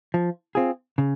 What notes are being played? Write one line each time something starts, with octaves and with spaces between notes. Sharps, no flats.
F3
C4 F4 G#4
C#3